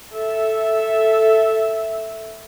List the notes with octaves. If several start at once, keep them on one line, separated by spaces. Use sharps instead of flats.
A4 E5